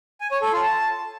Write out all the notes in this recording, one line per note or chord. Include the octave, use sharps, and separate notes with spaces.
G#5
C#5
A4
F4
A5